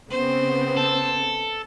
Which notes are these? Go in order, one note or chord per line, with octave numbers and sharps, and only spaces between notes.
C#3 B3 C4 C5
A4